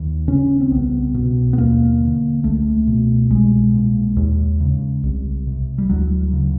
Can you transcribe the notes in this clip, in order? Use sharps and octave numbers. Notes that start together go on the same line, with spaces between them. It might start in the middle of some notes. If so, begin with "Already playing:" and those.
Already playing: D#2
C#3 C#4
C4
C2 B3
B2
B3
D#2 A#3
D3
C#2 A3
B2
C2 G#3
A#2
D#2
C#3
C2
C3
G3
D2 F#3
C#3